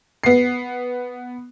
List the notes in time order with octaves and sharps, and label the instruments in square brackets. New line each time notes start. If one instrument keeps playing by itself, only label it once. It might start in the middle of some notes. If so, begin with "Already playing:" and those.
[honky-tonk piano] B3 C7